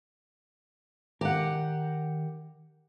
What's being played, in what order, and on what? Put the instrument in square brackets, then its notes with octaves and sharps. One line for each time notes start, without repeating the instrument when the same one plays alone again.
[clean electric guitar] D#3 A#4 [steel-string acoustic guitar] G4 F#5